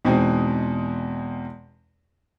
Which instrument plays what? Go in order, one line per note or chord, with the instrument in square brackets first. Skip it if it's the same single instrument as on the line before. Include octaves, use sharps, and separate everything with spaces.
[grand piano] E2 B2 G#3 C4 D#4